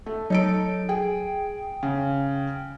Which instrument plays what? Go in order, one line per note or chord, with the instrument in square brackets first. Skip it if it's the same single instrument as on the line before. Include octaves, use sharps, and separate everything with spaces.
[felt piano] A3
[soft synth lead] F#3 [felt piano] D#4 A4 D7
[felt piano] G#4 [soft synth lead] G5
[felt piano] C#3